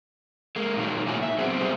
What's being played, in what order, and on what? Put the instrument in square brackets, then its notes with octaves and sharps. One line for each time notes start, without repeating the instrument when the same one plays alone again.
[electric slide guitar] G#3 A#3
A#2 D#3 F#3
A2 A#3 D#4 E4 F#4 G#5
E5
F#3 B3 C4 G#4
G3 B3 G4 G#4 C5